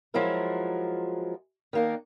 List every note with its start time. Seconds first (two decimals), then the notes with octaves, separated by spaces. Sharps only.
0.14 F3 F#3 G#3 E4 A#4
1.73 D#3 A#3 D4